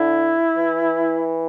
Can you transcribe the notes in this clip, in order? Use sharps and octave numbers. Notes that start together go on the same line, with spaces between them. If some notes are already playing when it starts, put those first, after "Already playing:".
Already playing: D3 E4
E3